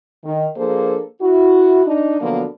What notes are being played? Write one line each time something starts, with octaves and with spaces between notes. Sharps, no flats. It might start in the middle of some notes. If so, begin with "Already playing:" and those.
D#3
F3 A#3 D4 G#4 A4 C5
E4 F#4
D4 D#4
B2 D3 F3 F#3 A#3 B3